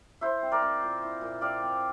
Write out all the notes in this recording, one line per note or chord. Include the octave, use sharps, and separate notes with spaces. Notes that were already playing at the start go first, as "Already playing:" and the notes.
E4 C5 E5
C4
A#4 D5
C4
A#2
E4
A#2
C4 D5 F5
C4